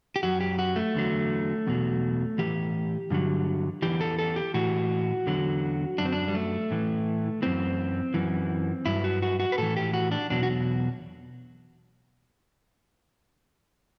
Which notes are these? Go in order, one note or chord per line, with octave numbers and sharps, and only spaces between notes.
G4
F#2 F#3 F#4
G4
F#4
A3
E2 D3 F#3
E2 B2 F#3
A2 E3 G4
G2 D3 F#3
E2 C3 E3 G4
A4
A4
G4
A2 E3 F#4
E2 D3 F#3
F#2 F#3 D4
C4
D4
G3
A3
A2 E3
F#2 E3 C4
F#2 E3
G2 F#3 E4
F#4
F#4
F#4
B4
A2 E3 A4
G4
F#4
D4
E2 B2 F#3 D4
F#4